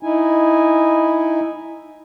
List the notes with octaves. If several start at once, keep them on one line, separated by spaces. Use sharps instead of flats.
D#4 E4 G#5